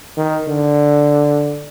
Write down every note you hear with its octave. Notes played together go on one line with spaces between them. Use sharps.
D#3
D3